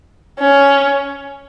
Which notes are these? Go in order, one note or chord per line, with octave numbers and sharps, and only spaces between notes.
C#4